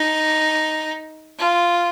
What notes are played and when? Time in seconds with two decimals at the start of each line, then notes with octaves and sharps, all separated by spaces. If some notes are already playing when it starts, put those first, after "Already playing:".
Already playing: D#4
1.38 F4